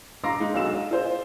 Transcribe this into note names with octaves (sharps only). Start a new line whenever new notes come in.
F5 A#5 C6 D6 E6 A#6
G#3 D#4
B1 F#4 F5 E6 E7
D#5
F4 G#4 C5